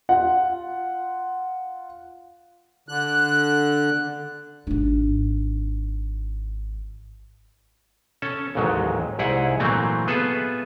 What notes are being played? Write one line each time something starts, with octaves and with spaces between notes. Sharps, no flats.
F4 F#5
D3 F#6
G#1 D4
C#4 A4
A1 D#2 G#2 F#3 G#3
C2 G#2 E4 G#4 F#5
A#2 E3 F#3 A3 A#3 C4
B3 F4 G#4 A4 B4 E5